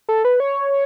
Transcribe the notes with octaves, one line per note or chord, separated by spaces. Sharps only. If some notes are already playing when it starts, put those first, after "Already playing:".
A4
B4
C#5